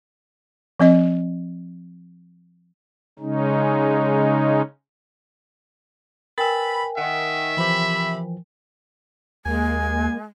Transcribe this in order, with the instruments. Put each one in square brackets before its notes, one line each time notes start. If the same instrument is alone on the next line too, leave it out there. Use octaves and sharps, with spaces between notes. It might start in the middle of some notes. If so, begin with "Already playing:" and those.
[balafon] F3 C4 D#5
[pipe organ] C#3 G#3 C#4 D#4
[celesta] A#4 G5 G#5 [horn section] B4 B5 [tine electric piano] E6 A6
[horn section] D#3 [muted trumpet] E5 [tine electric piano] F#5
[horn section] C3 B5 [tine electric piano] E3 F3
[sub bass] D#2 [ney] G#3 [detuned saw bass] A#3 [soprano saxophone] G#5